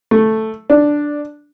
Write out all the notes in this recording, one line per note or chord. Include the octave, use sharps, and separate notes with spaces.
A3
D4